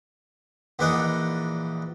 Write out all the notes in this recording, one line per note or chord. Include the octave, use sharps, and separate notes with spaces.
A#1 E3 D4 D#4 F#5 D#6